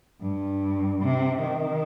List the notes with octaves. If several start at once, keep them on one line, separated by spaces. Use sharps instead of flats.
G2
C3
D#3